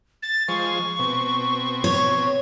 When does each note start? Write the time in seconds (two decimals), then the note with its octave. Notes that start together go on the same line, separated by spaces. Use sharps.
0.23 A6
0.48 F3 G#3 C5 C#6
0.99 B2 C4
1.84 C#5